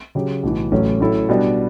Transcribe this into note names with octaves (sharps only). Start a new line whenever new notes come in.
C#3 F#3 C#4 G4
B1 A2 E3
A1 A2 F#3 A3 C#4
A2 F#3 C#4 E4 A4
B2 G3 B3 D4